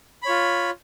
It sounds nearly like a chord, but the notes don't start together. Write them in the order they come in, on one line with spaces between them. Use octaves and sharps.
B5 C#5 F4